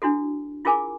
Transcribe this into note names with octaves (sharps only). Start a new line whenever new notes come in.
D4 E4 F#4 A4
E4 F4 G#4 A#4 G#5 D6